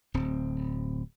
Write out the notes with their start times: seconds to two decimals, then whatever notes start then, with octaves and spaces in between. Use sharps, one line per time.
0.14 D1 C4